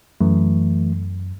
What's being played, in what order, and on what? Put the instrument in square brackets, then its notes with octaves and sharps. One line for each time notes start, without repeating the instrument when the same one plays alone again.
[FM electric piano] F#2 [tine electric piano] E3 A3